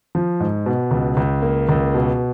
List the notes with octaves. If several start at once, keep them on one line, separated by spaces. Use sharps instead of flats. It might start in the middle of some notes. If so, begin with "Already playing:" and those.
F3
G#2
B2
C#2
C#2
A#3
C#2
B2